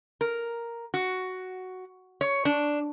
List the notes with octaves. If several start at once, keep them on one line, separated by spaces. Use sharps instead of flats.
A#4
F#4
C#5
D4